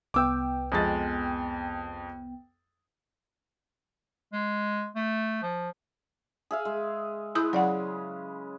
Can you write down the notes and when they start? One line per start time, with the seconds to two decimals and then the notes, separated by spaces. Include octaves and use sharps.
0.14 C2 B3 G5 D6 E6
0.72 F2 G#3 A6
4.33 G#3
4.96 A3
5.42 F3
6.51 G#4 E5 F5
6.65 G#3
7.35 G#3 E4 B4 D#6 G6
7.53 C#3 F#3 D5 F#5